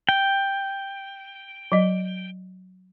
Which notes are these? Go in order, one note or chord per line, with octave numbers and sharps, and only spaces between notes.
G5
F#3 D#5